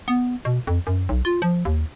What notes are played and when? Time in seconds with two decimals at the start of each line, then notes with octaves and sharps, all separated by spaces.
0.08 B3
0.45 B2
0.67 F2
0.87 F#2
1.09 B1
1.25 F4
1.42 F3
1.65 D#2